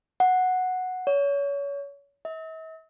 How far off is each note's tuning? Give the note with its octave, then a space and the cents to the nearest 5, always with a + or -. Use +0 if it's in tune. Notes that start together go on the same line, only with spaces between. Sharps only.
F#5 -5
C#5 +30
E5 -45